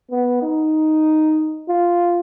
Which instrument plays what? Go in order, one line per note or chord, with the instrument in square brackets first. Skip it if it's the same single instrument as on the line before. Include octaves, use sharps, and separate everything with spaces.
[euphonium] B3
D#4
F4